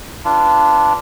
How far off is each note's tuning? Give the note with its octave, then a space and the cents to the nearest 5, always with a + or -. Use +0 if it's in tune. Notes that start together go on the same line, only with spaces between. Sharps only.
D4 +0 F4 -25 B4 +0